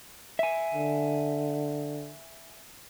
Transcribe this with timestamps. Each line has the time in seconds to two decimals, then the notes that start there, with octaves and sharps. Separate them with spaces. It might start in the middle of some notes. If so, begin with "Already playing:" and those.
0.39 E5 G#5
0.74 D3